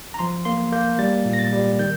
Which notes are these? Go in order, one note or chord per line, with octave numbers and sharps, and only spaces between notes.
A#5
F3 C6
A#3 C6
A#3 G6
G3 A6
A#2
A#6
A6
G3
D#3 G6